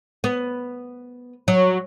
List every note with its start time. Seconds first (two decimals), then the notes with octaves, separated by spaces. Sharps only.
0.24 B3
1.48 F#3